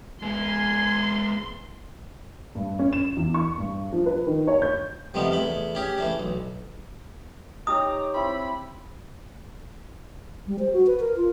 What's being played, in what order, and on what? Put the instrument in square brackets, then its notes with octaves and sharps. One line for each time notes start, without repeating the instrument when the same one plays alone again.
[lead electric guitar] G#3 B3 [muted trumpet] G#5 [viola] C6
[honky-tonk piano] G2
C#4
E7
E2
C#6
G2
F3
B4
D#3
C#5
G6
[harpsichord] C3 D#3 F3 G3 A3 B3
E2 A3 B5
C#4 G4 G#4
E3 A3 D4
B1
[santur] D#4 G4 C#5 [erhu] A#5 [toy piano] D#6
[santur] C4 E4 [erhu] B5
[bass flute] G3
C5
F#4
B4
A#4
F4